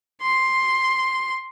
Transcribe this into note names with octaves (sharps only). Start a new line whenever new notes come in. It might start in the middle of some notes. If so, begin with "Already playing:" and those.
C6